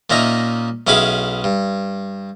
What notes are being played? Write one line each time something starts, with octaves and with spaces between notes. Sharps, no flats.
A#2 C#4 D#4 E5 A#5
B1 C#4 E4 G#4 F5 B5
G2